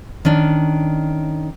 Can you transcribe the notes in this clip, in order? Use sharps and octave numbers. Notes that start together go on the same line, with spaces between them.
D#3 C#4 D4